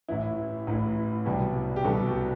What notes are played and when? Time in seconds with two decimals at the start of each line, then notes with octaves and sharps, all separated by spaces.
0.09 A1 A2 E3 E4
0.67 A1 A2 E3
1.26 C2 B2 G3
1.76 G4
1.84 C2 B2 G3 F#4 A4